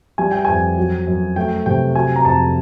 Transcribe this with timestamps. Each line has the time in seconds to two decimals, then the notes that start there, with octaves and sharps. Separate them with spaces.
0.18 G3 G#5
0.32 G5
0.45 F2 G#5
0.77 F#3
1.07 F#2
1.36 A3 G5
1.66 C3 G5
1.95 F#3 G#5
2.16 A#5
2.25 F2 A5